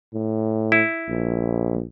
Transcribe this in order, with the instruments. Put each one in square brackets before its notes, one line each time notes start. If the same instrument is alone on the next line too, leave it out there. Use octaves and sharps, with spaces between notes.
[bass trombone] A2
[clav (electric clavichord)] E4
[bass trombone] A#1